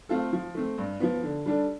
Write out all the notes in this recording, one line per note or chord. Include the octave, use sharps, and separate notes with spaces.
A3 C4 F4 A4
F3
A3 C4
G2
F3 B3
D3
G3 D4 A4